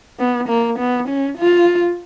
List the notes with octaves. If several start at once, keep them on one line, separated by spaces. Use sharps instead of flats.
B3
A#3
B3
C#4
F4